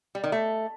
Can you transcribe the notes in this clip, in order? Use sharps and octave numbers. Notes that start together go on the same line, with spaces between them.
G3
D#3
A3